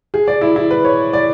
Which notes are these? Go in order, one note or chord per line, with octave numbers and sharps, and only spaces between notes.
G#4
D5
E4
E4
B4
C#5
D5